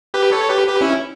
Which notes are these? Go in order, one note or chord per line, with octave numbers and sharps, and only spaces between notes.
G4 B4
A4 C#5
G4 B4
G4 B4
C#4 E4